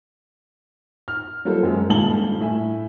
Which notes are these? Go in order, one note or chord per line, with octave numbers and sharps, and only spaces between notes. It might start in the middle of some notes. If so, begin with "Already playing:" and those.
F6
F#3 G3 A#3 F4 A4 C5
F#2 G#3
D#1 C#2 G2 A5 F#7 G7
A2 E5 G#5